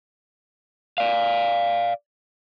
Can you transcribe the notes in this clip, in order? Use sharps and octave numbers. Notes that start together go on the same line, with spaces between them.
D5 F5